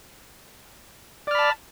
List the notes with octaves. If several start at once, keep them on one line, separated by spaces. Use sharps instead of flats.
D5 A5 B5 F6